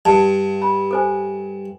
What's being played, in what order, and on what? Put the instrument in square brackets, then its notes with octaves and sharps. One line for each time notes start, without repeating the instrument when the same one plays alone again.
[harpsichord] G2 [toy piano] A5
[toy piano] B5
A4 C5 G#5